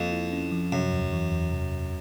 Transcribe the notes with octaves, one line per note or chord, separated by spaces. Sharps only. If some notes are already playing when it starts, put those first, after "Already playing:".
Already playing: F2 A#3
E4
C#4
F3
F#2 C3
E2
E3
E2
C3
E2